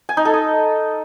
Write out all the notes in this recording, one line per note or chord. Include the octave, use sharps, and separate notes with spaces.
G#5
D#4
A4
D#5